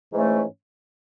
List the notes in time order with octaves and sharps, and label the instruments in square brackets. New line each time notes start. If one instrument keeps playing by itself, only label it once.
[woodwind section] G#2 E3 A3 C#4